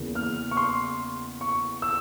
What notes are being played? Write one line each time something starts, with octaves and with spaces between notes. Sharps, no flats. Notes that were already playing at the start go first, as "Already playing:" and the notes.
Already playing: E2 C#3 E3 A#3
F6
C#6
C6
C#6
E6